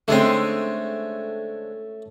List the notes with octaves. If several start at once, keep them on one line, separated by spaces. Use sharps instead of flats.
D3 G#3 A3 C4 C#4